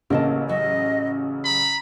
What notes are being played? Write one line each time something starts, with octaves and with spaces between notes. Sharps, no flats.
A1 C#3 A#3 D#5 A5
F#3 D#5
A#5 B5